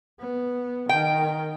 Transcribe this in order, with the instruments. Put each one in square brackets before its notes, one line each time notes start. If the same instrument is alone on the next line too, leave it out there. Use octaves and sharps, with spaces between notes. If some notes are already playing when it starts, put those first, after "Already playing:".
[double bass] B3
[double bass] D#3 [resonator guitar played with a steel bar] G5